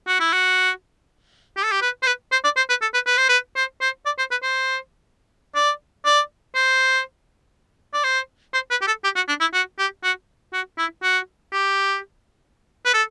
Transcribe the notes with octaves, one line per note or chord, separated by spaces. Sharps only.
F#4
E4
F#4
G4
A4
G4
B4
C5
B4
C5
D5
C5
B4
A4
B4
B4
C5
B4
C5
C5
D5
C5
B4
C5
D5
D5
C5
D5
C5
C5
B4
G4
A4
G4
F#4
D4
E4
F#4
G4
F#4
F#4
E4
F#4
G4
B4
A4